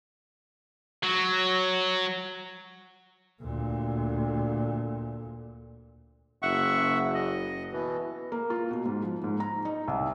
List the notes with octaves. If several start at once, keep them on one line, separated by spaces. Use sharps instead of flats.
F#3
D2 A#2
F#1 E5 F#5 C#6
D#5
B2 E3
A#3
F4
B2
G#2
F3
G#2
A#5
D#4
C2